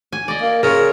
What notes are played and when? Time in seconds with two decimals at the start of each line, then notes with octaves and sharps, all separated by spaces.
0.12 G#5
0.28 D5 D#5
0.42 A#3
0.63 C#3 C#4 F4 A#4